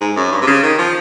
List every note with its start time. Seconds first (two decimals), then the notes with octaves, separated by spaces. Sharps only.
0.01 G#2
0.16 F#2
0.32 G2
0.42 C3
0.47 C#3
0.63 D#3
0.78 F3